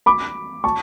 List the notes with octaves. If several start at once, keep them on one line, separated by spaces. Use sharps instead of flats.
B5 D6
A5 C#6